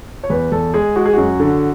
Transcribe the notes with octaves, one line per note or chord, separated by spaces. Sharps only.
C#5
E2 B4
E2 A4
G#3 G#4
G#3 F#4
G#4
F#2 F#4
D3